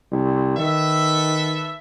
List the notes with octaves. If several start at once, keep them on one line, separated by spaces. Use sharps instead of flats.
C2
D#3 A4 B4 E5